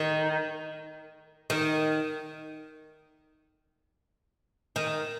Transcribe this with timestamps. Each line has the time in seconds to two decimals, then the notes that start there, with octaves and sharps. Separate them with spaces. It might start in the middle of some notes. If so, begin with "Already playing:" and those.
Already playing: D#3
1.50 D#3
4.76 D#3